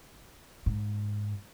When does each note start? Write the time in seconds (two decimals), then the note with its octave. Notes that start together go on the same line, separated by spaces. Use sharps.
0.66 G#2